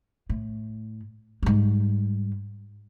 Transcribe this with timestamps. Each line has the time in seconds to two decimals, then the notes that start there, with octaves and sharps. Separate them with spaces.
0.29 A2
1.43 G#2 G3